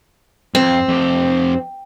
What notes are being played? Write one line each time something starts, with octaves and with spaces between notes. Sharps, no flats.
F2 C4
F2 G4